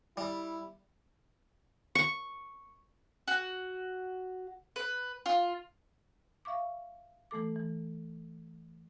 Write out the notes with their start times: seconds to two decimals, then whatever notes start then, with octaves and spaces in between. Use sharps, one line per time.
0.17 G3 E4
1.95 C#6
3.28 F#4
4.76 B4
5.26 F4
6.45 E5 F5 C#6 D6
7.31 E3 A3 A4 D6
7.56 E3